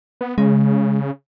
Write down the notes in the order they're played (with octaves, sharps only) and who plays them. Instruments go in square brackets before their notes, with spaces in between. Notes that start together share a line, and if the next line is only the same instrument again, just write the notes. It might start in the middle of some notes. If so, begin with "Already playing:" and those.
[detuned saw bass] B3
[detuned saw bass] C#3 [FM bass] G#3